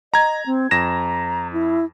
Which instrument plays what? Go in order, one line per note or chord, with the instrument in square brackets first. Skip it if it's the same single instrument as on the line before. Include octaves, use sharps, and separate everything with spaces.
[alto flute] D#5 [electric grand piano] A#5 G#6
[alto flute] C4
[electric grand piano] F2 A#6 E7 [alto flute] A#5
[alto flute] E4